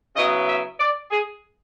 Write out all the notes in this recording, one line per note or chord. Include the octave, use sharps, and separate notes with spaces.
C#3 F#3 B3 E4 D#5
E5
D5
G#4